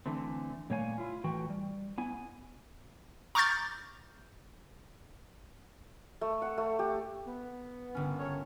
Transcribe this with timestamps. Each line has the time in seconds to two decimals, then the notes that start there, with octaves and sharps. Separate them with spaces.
0.06 D3 E3 A3 C4
0.70 A#2 G3 A3 C#5 F5 G#5
0.98 E4 F4
1.24 A2 E3 F#4 G5
1.50 G3
1.98 B3 E4 G#5
3.35 A#5 C#6 D6 F6 G6 A6
6.21 A3
6.42 F#5
6.58 A3
6.79 G4
7.27 B3
7.95 G1 C#4
8.19 A4 A#4 C#5